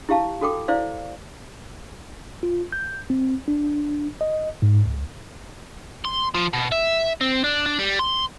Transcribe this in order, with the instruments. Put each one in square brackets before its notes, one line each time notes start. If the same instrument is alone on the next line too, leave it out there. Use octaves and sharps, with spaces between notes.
[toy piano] E4 G4 F5 A5
F#4 A4 G5 D6
E4 C5 D5 F5
[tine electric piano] F4
G6
C4
D4
D#5
G#2
C#2
[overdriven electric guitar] C6
F3
B2
E5
C4
D4
D4
G3
C6